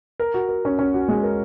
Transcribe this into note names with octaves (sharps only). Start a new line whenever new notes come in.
A#4
F#4
A#4
C#4
C#4
F#4
G#3
A#4